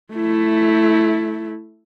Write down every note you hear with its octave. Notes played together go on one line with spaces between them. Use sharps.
A3 E4